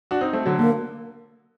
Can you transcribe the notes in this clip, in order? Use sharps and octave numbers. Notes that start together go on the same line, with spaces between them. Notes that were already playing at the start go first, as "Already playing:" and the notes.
D4 F#4
C4 D#4
A3 C4
D3 F#3
D3 A#3